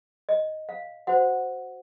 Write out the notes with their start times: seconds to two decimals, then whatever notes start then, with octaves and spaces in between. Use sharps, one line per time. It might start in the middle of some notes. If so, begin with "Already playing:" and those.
0.29 D#5
0.69 F5
1.07 F#4 C5 F#5